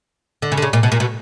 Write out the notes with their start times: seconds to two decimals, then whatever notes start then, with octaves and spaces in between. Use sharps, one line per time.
0.42 D3
0.52 C#3
0.57 D3
0.62 C#3
0.73 A#2
0.83 B2
0.92 A#2
1.00 B2